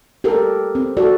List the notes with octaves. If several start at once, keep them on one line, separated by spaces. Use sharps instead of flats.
G4 A4 A#4
C4
F#4 A4 D5